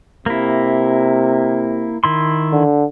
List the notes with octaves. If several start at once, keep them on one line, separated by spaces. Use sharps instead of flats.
C3 A#3 E4
D#3 E4 C6
D3